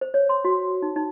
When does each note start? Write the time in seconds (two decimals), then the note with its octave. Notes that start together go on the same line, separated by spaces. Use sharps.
0.01 C5
0.14 C#5
0.29 C6
0.45 F#4
0.82 D#4
0.96 D#4